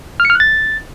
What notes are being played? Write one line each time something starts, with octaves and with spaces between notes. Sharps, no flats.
F6
C#7
F6
F#6
A6